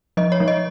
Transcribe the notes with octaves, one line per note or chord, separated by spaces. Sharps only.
F3 D#5
C#5
F3
D#5